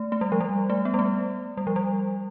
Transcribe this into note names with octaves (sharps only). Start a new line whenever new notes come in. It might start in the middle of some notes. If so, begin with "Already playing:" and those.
Already playing: A3
A3
G3
F3
G3
A3
B3
G3
A3
G3
F3
G3